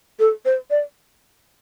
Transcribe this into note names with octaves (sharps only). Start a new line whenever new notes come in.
A4
C5
D5